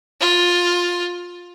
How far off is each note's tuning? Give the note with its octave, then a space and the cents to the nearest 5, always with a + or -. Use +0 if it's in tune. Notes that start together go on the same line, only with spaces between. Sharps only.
F4 +15